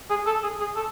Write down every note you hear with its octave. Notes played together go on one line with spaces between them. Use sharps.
G#4
A4
G#4
G#4
A4